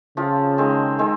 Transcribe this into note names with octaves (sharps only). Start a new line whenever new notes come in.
C#3 F3 C4 F4
D#3 G#3 C4
D#3 G#3 C4